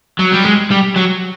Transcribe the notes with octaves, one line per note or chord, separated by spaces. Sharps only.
F#3
G3
G#3
G3
F#3